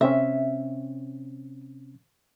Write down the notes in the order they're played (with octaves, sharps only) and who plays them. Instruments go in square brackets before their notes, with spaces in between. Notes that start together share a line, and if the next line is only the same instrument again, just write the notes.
[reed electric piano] C3 C4 C#4 [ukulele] E5